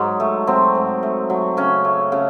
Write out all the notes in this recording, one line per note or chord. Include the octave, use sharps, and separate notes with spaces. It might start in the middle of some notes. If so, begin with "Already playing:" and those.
Already playing: G#2 F#3 D#4
A3
F#3 C4
G#2
A3
F#3
C#3 C#4
A3
C#3